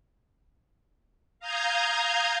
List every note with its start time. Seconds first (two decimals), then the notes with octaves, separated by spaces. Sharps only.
1.39 F5 A#5 D#6 F6 G6 G#6